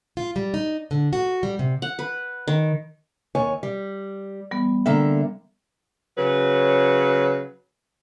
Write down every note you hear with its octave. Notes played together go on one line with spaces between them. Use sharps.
F4
G3
D#4
D3
F#4
G3
C3
F#5
B4
D#3
D#2 C#5 G#5
G3
E3 G3 B3
D3 A#3 E5 G5 A#5
C#3 F#3 B4